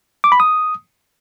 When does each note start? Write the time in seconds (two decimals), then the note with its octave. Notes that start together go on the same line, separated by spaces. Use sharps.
0.24 D6
0.32 B5
0.40 D#6